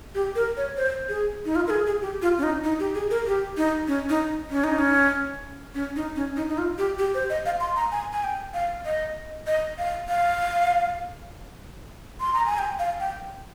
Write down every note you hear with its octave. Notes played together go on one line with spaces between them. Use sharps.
G4
A#4
C#5
C5
G#4
D#4
F4
A#4
G#4
G#4
G4
F4
C#4
D#4
D#4
G4
G#4
A#4
G4
D#4
C#4
D#4
C#4
D#4
C#4
C#4
D#4
C#4
D#4
D#4
F4
G4
G4
C5
D#5
F5
C6
A#5
G#5
G#5
G5
F5
D#5
D#5
F5
F5
C6
A#5
G#5
G5
F5
G5